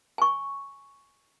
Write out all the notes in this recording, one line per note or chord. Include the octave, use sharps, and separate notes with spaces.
G#5 C#6